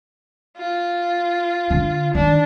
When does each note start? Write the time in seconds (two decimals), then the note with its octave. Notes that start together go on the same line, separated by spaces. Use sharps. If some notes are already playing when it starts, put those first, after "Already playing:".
0.58 F4
1.70 D3
2.15 D#3 D4